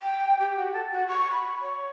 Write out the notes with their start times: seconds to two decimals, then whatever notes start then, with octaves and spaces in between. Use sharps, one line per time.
0.01 G5
0.39 G4
0.56 F#4
0.73 A4
0.91 F#4
1.08 C#6
1.31 B5
1.61 C#5